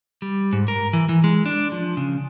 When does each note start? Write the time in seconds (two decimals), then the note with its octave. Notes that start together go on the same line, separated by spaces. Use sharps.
0.22 G3
0.53 G#2
0.68 A#4
0.93 E3
1.09 E3
1.24 G#3
1.46 D4
1.72 F3
1.97 C#3